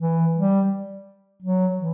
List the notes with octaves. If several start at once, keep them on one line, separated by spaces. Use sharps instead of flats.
E3
G3
F#3
E3